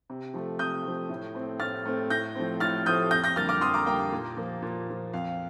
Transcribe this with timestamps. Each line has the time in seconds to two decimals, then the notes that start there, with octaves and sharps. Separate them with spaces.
0.10 C3
0.34 F3 A3
0.59 C3 D#6 G6
0.85 F3 A3
1.10 A2
1.35 A3 C4
1.60 A2 F6 A6
1.85 A3 C4
2.10 A2 G6 A#6
2.35 F3 A3 C4
2.60 A2 F6 A6
2.86 F3 A3 C4 D#6 G6
3.11 F2 G6 A#6
3.24 G6 A#6
3.36 D3 G3 A#3 F6 A6
3.49 D6 F6
3.61 F2 C6 D#6
3.74 A#5 D6
3.86 D3 G3 A#3 G5 A#5
4.12 A#2
4.37 F3 A#3
4.62 A#2
4.88 F3 A#3
5.14 F2 F5